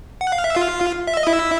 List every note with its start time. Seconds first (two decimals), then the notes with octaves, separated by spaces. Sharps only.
0.21 F#5
0.32 F5
0.44 E5
0.55 F4 F5
1.07 E5
1.17 D#5
1.27 E4 E5